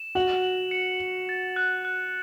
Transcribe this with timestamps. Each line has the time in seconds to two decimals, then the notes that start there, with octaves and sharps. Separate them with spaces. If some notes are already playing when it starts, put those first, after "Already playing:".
Already playing: E7
0.15 F#4 F#7
0.43 F#7
0.71 C#7
1.00 F#7
1.29 A6
1.56 F#6
1.85 F#6